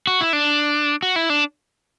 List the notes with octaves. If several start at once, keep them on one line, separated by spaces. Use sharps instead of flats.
F#4
E4
D4
F#4
E4
D4